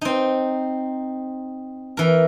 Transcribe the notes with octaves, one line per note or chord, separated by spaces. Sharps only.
C4 D#4
E3 A#4